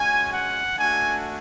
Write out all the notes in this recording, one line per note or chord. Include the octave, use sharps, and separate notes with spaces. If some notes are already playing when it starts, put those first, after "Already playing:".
Already playing: G#3 C#4 F#4 G#5
F#5
A3 D4 F#4 G#5